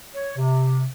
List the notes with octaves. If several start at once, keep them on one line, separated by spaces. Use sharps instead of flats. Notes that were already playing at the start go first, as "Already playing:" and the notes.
C#5
C3